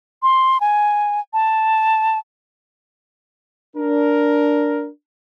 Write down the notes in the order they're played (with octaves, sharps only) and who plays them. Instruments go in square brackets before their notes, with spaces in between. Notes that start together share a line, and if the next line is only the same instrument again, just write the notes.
[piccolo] C6
G#5
A5
[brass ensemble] D4 A#4